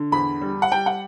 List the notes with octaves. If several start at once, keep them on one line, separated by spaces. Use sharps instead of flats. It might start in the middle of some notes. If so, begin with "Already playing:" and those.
Already playing: D3
E2 B5
G3
F#5
G3 G5
F#5